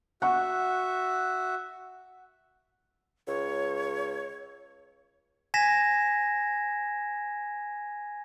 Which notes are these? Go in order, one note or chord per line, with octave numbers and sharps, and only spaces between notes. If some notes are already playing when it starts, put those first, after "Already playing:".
F#4 E5 F#5 C#6
C#2 C#5
G#5 G#6 A#6 B6 E7